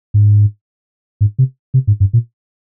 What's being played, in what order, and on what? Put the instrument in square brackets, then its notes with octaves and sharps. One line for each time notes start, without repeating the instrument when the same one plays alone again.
[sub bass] G#2
G#2
C3
C3
G#2
G2
A#2